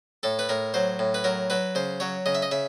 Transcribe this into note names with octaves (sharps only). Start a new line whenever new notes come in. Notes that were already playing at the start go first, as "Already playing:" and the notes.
A2 A4
B4
A2 A#4
F#3 C5
A2
B4
F#3 A#4
F#3 B4
C#3 C5
F#3 C#5
C#3 D#5
E5
D#5
C#3 E5